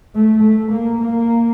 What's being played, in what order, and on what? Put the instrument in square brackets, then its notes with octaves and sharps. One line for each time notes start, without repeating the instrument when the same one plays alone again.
[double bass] A3
A3
A#3
A#3